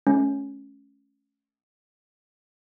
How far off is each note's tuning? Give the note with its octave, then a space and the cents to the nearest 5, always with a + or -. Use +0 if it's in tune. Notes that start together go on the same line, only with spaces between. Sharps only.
A3 -35 C#4 +0